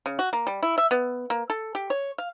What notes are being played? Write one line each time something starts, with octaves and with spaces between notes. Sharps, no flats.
C#3
F#4
A#3
G3
E4
E5
B3
A#3
A4
G4
C#5
F5